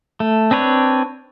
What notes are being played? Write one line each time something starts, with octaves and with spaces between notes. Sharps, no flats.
A3
C4 D4 B4 C#5